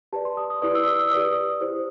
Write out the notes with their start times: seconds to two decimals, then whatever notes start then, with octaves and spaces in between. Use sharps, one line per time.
0.13 G4 B4 D5 A5
0.25 C6
0.37 D#6
0.50 D#6
0.62 E4 G4 B4 D5 D#6
0.75 E6
0.87 D#6
0.99 E6
1.11 G4 B4 D5 D#6
1.61 E4 G4 C5